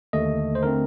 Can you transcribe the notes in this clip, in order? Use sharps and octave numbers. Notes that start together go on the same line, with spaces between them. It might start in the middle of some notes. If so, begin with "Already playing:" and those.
D#2 D3 A3 D#5
C5
D3 A3 C4 A#4